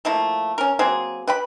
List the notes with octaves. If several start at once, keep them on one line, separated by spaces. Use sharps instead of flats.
F3 A3 A#3 E4
C#4 A#4
F#3 A#3 C4 G#4
B4 G5 B5